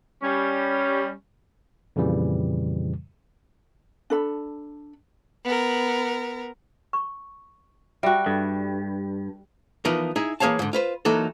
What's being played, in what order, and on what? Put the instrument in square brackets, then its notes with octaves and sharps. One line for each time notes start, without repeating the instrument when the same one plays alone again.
[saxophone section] G3 C#4
[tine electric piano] F2 A#2 C#3 E3 G3
[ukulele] D4 A4 B5
[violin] B3 A#4
[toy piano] C#6
[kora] G3 F#4 [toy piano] E5 G5
[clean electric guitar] G2 [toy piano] A4
[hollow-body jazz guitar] E3 F3 B3 D#4 A#4
D#4 E4 G#4
E3 A#3 G#4 C#5 F5 A5
G#2 D3
F4 B4 C5
E3 F#3 A#3 D#4 F#4 A4